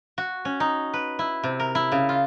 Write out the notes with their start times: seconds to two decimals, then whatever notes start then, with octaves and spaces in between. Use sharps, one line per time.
0.18 F#4
0.45 C#4
0.60 D#4
0.94 B4
1.19 E4
1.43 C3
1.60 A#4
1.75 E4
1.92 C#3
2.09 F4